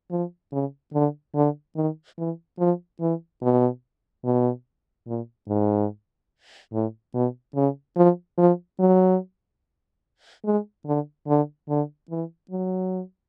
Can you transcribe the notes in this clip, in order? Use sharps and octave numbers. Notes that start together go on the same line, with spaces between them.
F3
C#3
D3
D3
D#3
E3
F3
E3
B2
B2
A#2
G#2
A2
B2
C#3
F3
F3
F#3
G#3
D3
D3
D3
E3
F#3